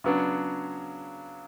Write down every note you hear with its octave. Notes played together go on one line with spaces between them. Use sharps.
C#3 F#3 B3 D4